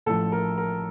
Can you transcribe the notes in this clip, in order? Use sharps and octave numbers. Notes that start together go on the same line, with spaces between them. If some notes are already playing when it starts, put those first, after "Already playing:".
A1 A2 F3 A4
A#4
A#4